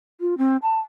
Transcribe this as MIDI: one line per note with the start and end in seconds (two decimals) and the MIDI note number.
0.21 0.37 65
0.38 0.57 60
0.62 0.79 81